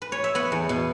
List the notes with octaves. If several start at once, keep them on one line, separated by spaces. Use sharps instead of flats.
B4
C#5
E5
B3 F#5
E2
B2